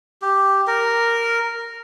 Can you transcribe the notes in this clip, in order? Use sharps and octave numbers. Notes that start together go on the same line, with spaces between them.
G4
A#4